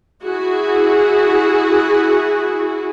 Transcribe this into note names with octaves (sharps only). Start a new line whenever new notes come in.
E4 F#4 G#4